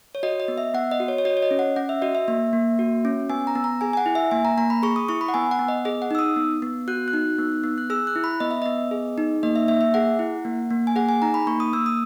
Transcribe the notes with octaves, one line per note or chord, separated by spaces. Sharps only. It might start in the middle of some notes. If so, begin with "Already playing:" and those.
C#5
F#4 D#5
D#5
B3
E5
B3 F#5
D#5
F#4
C#5
C#5
F#4 D#5
C#5
D#5
C#4
F#5
C#4 F#5
E5
F#4 D#5
E5
A#3 E5
A#3
F#4
C#4
B3 G#5
A#5
B3
A#5
G#4 G#5
G#5
F#5
E4
E5
A#3 G#5
A#5
A#3 A#5
B5
G#4 C#6
D#6
E4 C#6
B5
F#5
B3 G#5
F#5
B3
D#5
G#4 D#5
F#5
D#4 E6
D#6
B3
B3
F#4 F#6
F#6
D#4
B3
B3
F#6
G#4 E6
F#6
E4
B5
B3 D#5
E5
B3 D#5
G#4
D#4
A#3 D#5
E5
A#3 E5
E5
G#4 F#5
E4
A#3
A#3
G#5
G#4 F#5
G#5
D#4 A#5
B5
A#3 C#6
D#6
A#3 E6
D#6